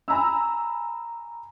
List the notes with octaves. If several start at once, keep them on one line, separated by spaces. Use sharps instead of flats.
G#5 A#5 B5 E6